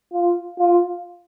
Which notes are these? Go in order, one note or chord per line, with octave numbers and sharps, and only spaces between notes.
F4
F4